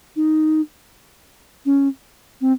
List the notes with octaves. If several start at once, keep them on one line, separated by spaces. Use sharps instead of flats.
D#4
C#4
C4